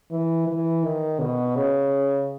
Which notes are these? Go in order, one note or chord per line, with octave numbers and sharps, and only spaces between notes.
E3
E3
D#3
B2
C#3